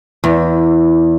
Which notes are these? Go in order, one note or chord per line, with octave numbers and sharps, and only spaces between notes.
E2